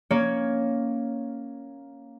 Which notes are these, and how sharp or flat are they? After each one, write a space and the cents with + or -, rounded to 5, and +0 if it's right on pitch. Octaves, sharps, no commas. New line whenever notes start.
A#3 +0 C#4 +0 C#5 +5